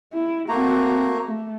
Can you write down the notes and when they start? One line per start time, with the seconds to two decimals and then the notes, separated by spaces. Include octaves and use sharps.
0.14 E4
0.49 A3 A#3 C4 F#4 A#5
1.26 A3